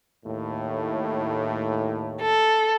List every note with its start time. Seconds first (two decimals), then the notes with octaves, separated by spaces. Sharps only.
0.24 D#2 A2
2.22 A4